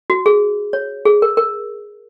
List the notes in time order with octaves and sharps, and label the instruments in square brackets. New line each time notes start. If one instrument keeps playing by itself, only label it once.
[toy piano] F#4
G#4
C#5
G#4
A#4
A#4